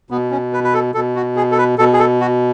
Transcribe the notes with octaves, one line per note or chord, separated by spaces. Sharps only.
B2 B3
C#4
B4
B4
A4
B2 A4
F#4
G#4
A4
B4
B2 A4
G#4
A4
F#4